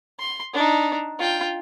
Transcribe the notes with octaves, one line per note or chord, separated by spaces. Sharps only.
C6
D4 D#4
F4 G5